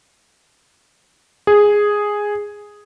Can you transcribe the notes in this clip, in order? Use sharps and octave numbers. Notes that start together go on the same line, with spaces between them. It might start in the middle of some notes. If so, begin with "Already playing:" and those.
G#4